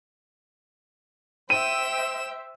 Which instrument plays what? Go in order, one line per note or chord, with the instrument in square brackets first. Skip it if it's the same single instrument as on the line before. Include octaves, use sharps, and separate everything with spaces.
[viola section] C5 E5 [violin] G5 E7 [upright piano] D#7